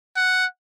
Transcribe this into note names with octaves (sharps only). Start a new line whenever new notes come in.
F#5